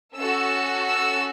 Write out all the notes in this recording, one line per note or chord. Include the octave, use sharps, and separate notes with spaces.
C#4 F#4 A4 E6
E6